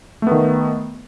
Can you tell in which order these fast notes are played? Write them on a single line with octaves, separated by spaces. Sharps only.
A3 B3 D#3